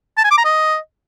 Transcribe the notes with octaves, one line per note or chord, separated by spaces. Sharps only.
A5
G#5
D6
A#5
D#5